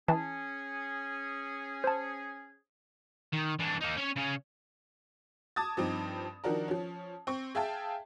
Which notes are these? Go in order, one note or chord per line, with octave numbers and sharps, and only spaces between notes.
E3 C#4 G#4 A5
C5 A5
D#3
E3 D4
A#3 D#4
C#4 C#5
C#3 C#4
A5 D6 D#6 G#6 A6
G2 F3 C4 D#4
D#3 F3 D4 F#4 A#4
F3 C#4
C4 C#6
G#4 E5 F5 G5 A5